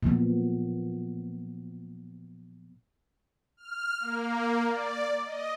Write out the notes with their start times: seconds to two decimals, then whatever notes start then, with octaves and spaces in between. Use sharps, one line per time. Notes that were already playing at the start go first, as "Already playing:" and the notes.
0.03 A#2 F3 F#3 B3
3.57 F6
4.00 A#3
4.65 D5
5.24 D#5